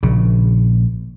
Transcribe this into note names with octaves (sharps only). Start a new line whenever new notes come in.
A#1 C#3